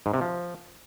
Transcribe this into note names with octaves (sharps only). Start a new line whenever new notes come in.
G#2
C3
F3